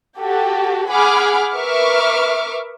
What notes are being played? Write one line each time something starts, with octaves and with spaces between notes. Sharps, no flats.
F#4 G4 A4
G#4 F#5 B5 D6 F6
A#4 B4 E5 C#6 D6 F6